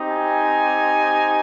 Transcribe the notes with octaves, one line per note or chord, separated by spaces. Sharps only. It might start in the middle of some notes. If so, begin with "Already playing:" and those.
Already playing: C4 D#4 G4
G#5